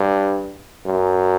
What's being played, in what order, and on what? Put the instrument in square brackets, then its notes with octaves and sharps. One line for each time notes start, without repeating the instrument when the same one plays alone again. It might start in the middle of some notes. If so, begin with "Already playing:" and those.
Already playing: [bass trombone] G2
F#2